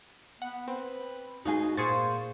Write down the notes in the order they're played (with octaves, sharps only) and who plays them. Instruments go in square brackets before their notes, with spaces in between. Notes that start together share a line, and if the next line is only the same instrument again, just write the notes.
[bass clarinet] B3 [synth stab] F#5
[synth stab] C4 [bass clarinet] B4
[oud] D#4 F4 G#4 [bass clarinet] F#4
[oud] A#2 [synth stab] G#4 C#6 A6 [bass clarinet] C5